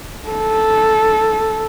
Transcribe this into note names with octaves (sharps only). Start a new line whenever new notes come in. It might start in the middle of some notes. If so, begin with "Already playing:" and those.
A4